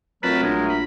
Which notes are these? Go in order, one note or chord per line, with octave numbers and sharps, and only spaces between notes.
F2 F#3 A3 A#4 B4 A5 B5
A#1 G#3
B5